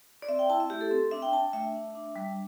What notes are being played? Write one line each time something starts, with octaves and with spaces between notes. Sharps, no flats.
D5
C4 E5
G5
E4 A5
E5
A3 G4
A4
C4
D4 E5
G5
D4 A5
G5
A3 E5
D4
D4
G3